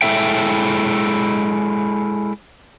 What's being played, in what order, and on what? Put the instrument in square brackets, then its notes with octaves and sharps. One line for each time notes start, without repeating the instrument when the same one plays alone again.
[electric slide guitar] G#3 C4 E4 A4 E5 G5